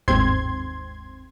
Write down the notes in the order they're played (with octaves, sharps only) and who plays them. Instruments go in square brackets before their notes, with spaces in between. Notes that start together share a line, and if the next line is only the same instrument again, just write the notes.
[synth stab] G1 D#2 G#2 C4 C6 G#6